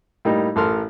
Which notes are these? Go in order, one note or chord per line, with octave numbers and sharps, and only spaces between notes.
A2 G3 A#3 D#4
A1 A4 A#4 C6 F6